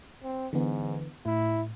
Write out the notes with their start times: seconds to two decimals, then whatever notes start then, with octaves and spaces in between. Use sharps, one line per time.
0.23 C4
0.53 G#2 D3 E3 B3
1.26 A2 E4